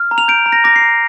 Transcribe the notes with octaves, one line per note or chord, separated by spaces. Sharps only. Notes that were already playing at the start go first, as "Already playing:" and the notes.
Already playing: F6
A#5
F7
G6 D7
A#5
A#6
D6 A#6
C7
A#5